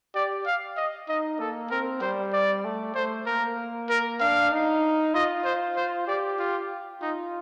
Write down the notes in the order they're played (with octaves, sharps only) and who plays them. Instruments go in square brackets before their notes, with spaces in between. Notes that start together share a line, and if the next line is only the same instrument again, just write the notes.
[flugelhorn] G4 [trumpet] D5
[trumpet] F5
D#5
[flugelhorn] D#4 [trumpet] D#5
[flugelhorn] A#3 [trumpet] A4
[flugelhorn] C4 [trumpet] A#4
[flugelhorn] G3 [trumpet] C5
[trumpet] D5
[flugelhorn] A3
[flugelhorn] A3 [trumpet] C5
[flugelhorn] A#3 [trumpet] A#4
[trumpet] A#4
[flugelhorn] D4 [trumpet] F5
[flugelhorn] D#4
[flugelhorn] F4 [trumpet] D#5
[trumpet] C5
C5
[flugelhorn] G4 [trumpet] D5
[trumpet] F4
[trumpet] D#4 [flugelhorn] F4